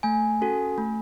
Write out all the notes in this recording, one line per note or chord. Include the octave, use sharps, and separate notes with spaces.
A3 G#5
C#4 F#4 A4
A3